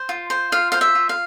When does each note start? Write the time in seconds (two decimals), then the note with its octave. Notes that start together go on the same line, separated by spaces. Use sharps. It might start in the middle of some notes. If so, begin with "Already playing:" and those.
Already playing: C5
0.09 F4
0.30 C5
0.52 F4 F5
0.72 C5 F5
0.81 E5
0.95 F4
1.09 F5